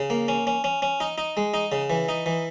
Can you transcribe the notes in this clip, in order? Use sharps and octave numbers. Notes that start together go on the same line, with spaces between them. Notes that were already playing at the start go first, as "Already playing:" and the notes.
Already playing: C#3
A#3
C#4
C#4
C#4
C#4
D#4
D#4
G#3
D#4
C#3
E3
D#4
E3